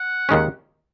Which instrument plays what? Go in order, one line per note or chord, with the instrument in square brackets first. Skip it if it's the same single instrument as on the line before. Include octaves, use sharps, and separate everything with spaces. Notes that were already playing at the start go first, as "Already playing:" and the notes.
Already playing: [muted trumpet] F#5
[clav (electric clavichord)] D#2 D#3 G#3 C#4